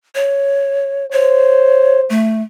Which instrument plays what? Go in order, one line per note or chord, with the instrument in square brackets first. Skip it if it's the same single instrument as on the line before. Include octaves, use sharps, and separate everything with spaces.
[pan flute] C#5
[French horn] C5 [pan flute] C#5
[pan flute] A3